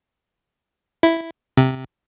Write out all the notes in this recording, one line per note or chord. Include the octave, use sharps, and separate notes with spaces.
E4
C3